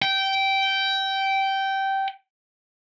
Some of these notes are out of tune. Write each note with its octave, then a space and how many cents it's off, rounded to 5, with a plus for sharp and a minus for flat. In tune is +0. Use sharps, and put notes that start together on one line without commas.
G5 -15